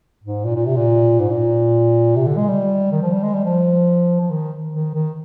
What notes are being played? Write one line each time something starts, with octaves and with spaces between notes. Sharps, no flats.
G#2
A#2
A#2
C3
A#2
G#2
A#2
C3
D3
G#3
G3
D#3
F3
G3
G#3
G3
F3
F3
D#3
D#3
D#3